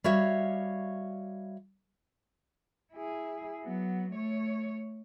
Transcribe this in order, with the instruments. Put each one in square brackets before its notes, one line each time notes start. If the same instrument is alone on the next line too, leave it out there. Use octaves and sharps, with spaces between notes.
[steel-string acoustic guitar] G3 F#4 C#5 E5 F5
[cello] E4 G#4
F#3 B3
A3 C#5